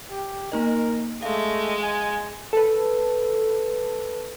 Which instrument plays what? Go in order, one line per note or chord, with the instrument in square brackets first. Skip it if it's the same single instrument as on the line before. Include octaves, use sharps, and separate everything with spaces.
[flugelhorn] G4
[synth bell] A#3 D#4 D#5 [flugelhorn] A#4
[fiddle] G#3 [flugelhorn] A3 [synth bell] F5
[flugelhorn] G#5
[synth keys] A4 B4